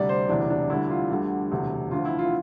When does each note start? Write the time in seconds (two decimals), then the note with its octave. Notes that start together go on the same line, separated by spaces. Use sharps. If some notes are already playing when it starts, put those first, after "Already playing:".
Already playing: D2 C3 G3 D5
0.09 C5
0.29 E1 D2 C3 E3 D4
0.50 D4
0.70 D2 D3 G3 E4
0.90 F4
1.11 D2 D3 G3
1.51 E1 D2 C3
1.91 D2 D3 F3 F4
2.05 E4
2.19 F4